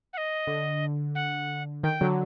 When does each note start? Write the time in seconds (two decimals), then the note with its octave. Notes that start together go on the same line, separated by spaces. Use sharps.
0.13 F#5
0.18 D#5
0.47 D3
1.15 F#5
1.83 D#3 G5
2.01 D3 F#3